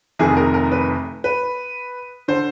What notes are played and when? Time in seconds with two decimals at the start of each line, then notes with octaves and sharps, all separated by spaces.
0.19 F1 F2 C3 D#3 G#4
0.37 A#4
0.54 A#4
0.72 B4
1.24 B4
2.28 D3 C5